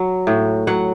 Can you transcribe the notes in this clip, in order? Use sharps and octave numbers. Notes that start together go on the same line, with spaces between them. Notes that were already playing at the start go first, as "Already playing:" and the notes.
Already playing: F#3
A2
F#3 F#5